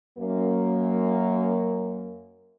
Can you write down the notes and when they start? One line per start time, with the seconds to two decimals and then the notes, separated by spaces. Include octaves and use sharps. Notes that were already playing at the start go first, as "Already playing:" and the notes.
0.18 F#2 A#3